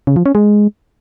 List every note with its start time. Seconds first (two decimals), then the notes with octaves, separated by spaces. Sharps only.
0.07 C#3
0.16 F3
0.26 C#4
0.35 G#3